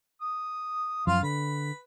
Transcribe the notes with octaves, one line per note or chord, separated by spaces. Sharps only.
D#6
F#2 F3 F4 F5 C6
D3 B4